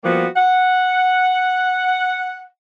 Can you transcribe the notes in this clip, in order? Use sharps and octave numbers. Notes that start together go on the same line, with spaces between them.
F3 G3 A#3 B3 F#4
F#5